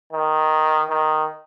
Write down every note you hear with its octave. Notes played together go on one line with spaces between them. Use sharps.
D#3
D#3